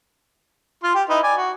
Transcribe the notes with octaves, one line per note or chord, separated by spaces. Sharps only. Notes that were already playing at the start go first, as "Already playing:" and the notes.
F4 C6
G4
D#4 E4 B4
D5 G#5
F#4